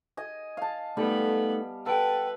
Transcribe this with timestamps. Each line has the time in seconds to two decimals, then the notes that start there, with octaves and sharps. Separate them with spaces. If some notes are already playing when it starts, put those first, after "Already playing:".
0.17 D#5 G#5
0.57 F5 A5
0.97 G3 A3 B3 D#4 A4 B5
1.86 A4 B4 F#5 G5